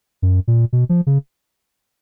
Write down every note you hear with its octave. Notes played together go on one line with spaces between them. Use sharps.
F#2
A#2
B2
F3
C#3